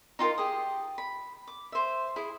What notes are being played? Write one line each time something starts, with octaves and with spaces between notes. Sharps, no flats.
D#4 F4 G4 A#4
G4 G#4 D#6
B5
D6
C5 E5
E4 G#4